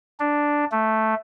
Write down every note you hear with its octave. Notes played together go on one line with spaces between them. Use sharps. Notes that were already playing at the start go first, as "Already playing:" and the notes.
D4
A3